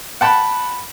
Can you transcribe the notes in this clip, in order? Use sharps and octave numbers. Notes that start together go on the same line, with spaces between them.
F#5 G5 A5 B5